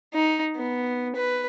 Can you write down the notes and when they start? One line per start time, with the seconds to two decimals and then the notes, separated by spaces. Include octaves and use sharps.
0.14 D#4
0.57 B3
1.16 B4